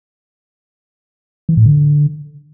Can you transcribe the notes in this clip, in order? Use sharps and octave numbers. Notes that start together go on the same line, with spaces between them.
E3
A2
D3